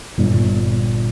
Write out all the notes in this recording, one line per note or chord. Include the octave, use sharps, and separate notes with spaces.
G1 A#2